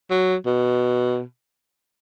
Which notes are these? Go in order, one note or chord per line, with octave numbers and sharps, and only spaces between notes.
F#3
B2